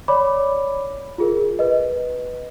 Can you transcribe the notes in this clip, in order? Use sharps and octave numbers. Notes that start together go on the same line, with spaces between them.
C#5 D5 B5 D6
F4 G#4 A#4
B4 D#5